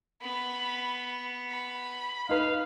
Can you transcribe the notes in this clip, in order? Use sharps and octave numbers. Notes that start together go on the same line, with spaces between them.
B3 B5
B5
D#4 B4 F5